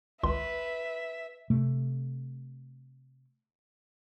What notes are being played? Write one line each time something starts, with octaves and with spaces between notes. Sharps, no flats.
G#1 C#2 B4 E5 C6
C3 A3